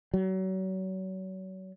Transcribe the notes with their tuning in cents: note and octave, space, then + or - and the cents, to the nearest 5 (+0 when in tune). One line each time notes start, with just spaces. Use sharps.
F#3 +35